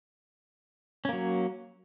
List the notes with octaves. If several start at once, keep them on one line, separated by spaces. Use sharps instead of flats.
F#3 A#3 C#4